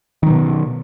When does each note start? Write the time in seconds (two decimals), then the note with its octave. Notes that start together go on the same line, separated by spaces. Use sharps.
0.23 D#3
0.27 F#3
0.30 B2